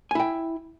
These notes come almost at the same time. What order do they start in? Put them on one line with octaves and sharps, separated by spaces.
G#5 E4 G5